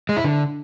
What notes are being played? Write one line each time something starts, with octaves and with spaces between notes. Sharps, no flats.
G#3
E4
D3